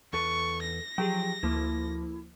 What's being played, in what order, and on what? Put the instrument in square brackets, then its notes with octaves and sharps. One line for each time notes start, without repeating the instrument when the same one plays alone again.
[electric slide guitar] E2 A4 B4 [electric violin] C#6
[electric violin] A#6
[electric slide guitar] F3 G5 [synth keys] F#3 G4 G#4
[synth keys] D2 F3 A#3 [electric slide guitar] E4